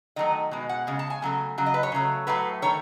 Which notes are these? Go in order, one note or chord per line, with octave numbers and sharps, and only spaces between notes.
D#3 F#3 A3 D#5
B2 G#3
F#5
C#3 G#3
A5
G#5
C#3 F#3 A3
C#3 F#3
D#5
B4
C#5
C#3 F#3 A3
A2 F#3 A3 B4
D#3 A3 C#5